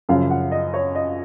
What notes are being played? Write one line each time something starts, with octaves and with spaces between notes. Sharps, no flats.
F#2 C#3 F3 F5
F#5
D#5
C#5
D#5